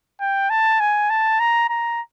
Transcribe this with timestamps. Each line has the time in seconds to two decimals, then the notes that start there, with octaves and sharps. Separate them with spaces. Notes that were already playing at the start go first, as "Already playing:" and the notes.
0.21 G5
0.50 A5
0.80 G#5
1.10 A5
1.40 A#5
1.69 A#5